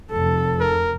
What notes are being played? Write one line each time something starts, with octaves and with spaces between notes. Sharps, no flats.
F1 A4
A#4